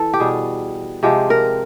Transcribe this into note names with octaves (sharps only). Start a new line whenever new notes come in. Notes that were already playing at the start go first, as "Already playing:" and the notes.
Already playing: E3 A4
G4
B2 G3 G#4
C3 F3 G#3 G4
A#4